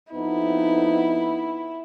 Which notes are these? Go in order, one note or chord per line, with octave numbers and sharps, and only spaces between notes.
F2 B3 D#4 E4